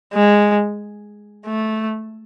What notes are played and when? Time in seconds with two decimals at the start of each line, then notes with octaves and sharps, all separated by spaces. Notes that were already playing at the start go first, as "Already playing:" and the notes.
0.14 G#3
1.46 A3